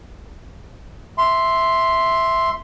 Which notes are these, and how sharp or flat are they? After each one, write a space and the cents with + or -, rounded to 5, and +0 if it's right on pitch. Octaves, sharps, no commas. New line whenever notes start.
E5 +0 C6 +0